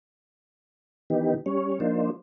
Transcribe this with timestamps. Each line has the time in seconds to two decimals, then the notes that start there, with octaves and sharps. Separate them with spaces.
1.10 D#3 E3 B3 D#4 G4
1.46 G3 C#4 C#5
1.80 F3 A#3 D4 D#4 F4 C5